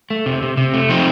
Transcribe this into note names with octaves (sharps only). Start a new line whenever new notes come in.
A3
C3
C3
C3
A3
F3 C4 D#4